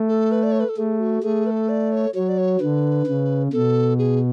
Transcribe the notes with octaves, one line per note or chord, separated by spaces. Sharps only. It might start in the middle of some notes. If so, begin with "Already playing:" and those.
Already playing: A3
A4
B4
D5
C#5
B4
A4
A3 G#4
F#4
A3 G#4
B4
A4
D5
C#5
F#3 C#5
D5
C#5
D3 B4
C#3
B2 A4
G#4